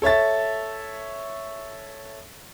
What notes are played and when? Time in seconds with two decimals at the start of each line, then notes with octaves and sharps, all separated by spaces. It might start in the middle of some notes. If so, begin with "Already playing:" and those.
0.02 A4 C#5 E5 A6